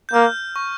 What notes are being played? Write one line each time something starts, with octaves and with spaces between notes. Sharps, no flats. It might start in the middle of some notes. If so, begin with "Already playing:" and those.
G6
A#3 F6
C#6